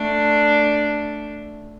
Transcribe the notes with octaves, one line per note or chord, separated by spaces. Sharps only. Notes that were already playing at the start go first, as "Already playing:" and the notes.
Already playing: A3 D4